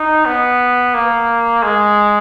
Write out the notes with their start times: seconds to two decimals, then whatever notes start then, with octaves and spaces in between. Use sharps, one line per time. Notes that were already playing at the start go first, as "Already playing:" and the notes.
Already playing: D#4
0.25 B3
0.94 A#3
1.62 G#3